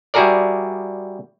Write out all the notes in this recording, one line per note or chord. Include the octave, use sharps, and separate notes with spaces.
G3 E4 F#4 G#4 A#4 D5